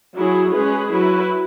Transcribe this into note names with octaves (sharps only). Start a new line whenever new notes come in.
F#3 E4 G#4
G#3 C#4 G#4 B4
F#3 E4 B4